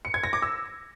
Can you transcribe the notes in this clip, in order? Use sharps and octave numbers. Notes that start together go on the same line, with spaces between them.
C#7
G#6
A#6
D6
E6